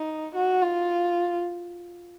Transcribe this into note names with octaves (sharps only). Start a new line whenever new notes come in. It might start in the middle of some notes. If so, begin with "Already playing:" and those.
Already playing: D#4
F#4
F4